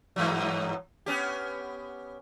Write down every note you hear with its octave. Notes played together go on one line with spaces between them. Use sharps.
G2 E3 F#3
B3 C#4 G4